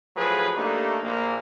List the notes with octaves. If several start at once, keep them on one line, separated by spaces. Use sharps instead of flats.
A2 F3 F#3 G#4 B4
A3 A#3 D4 D#4 G4
A#1 A#3